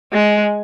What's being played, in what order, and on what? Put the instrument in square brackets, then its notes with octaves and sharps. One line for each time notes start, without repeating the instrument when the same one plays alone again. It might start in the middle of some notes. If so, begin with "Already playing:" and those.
[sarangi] G#3